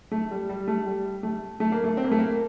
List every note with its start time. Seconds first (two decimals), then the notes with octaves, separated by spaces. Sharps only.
0.12 A3
0.31 G3
0.49 G3
0.68 A3
0.86 G3
1.23 A3
1.60 A3
1.72 A#3
1.84 A3
1.97 C4
2.04 A#3
2.12 A3
2.19 A#3